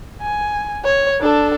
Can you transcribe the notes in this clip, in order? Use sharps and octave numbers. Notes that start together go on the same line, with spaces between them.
G#5
C#5
D4 A4